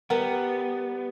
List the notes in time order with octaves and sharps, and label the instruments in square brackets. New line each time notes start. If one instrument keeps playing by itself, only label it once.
[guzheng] G3 [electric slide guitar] B3 [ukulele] A#4 [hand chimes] B4 F#5